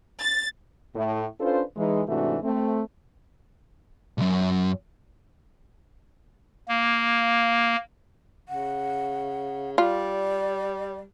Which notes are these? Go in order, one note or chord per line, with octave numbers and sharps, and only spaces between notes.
A6
A2
C#4 D4 F4 A4 B4 C5
E3 G#3 D#4
G#2 C3 E3 A3 D4 F#4
A3 C4
B1 F#2
A#3
C#3 F#5
G3 F4 D5